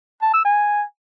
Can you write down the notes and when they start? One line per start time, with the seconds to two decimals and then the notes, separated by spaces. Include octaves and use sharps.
0.22 A5
0.34 E6
0.45 G#5